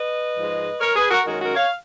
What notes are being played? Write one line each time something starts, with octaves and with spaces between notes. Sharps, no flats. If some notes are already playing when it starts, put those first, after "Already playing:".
Already playing: B4 D#5
G#2 F3 G#3
A#4 C#5
G#4 B4
F#4 A#4
F#2 D#3 G#3 C#4 F#4 A#4
F#4 A#4
C#5 F5